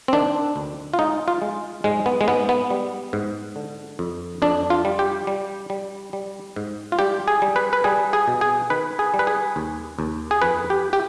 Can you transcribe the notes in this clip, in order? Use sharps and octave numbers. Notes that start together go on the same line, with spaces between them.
C4
D#3 D4
D2
F4
G#3 D#4
F4
G#3
G#2 G#3
B3
G#3
G#2 B3
B3
G3
G#2
D3
F2
F2 D4
F4
G3
G4
G3
G3
G3
G#2
F4
G3 G4
G#4
G3
B4
B4
G3 G#4
G#4
B2
G#4
D#3 B4
G#4
G3
B4
G#4
D#2
D#2
G#4
F2 B4
G4
G4